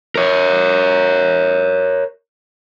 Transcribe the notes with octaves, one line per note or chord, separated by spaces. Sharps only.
A#4 C#5